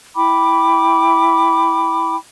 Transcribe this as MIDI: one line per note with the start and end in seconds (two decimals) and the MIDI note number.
0.15 2.15 64
0.15 2.15 79
0.15 2.15 83
0.15 2.15 86